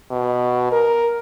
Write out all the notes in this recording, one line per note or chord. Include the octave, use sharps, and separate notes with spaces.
B2
A#4